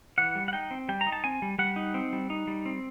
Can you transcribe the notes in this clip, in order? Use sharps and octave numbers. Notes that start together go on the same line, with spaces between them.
E3 F#5
G3
F#5
D#4 G5
C4
G3 G5
A#5
D#4
A5
C4 G#5
G3
G3 F#5
D#4
C4
G3
D#4
G3
C4